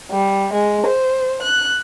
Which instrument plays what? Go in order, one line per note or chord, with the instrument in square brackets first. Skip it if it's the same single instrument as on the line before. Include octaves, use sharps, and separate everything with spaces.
[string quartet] G3
G#3
C5
F#6